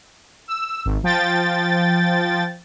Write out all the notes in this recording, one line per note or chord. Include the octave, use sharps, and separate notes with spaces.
E6
G#1
F3 G5 A6